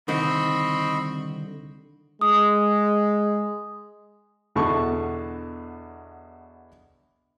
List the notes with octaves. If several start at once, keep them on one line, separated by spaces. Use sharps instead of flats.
C2 D3 D#3 C4 D#5 B5 C#6
G#3 D#6
E2 B2 D3 A5 C#6